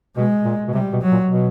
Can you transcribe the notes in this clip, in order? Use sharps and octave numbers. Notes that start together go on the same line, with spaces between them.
B2 G#3
A#2
B2
C3 G3
B2
F#3
A#2
B2